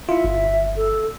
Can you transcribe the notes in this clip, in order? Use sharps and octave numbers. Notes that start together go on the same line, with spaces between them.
E4 F4 E5
G1
A4